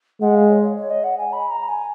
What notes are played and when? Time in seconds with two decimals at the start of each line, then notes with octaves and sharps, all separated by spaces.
0.21 G#3 F#5
0.35 F5
0.50 C#5
0.63 C#5
0.77 C#5
0.90 D#5
1.04 F#5
1.18 G#5
1.33 B5
1.50 A#5
1.69 G#5